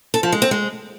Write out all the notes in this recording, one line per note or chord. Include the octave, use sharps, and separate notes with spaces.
A4
F3
G#3
C4
G#3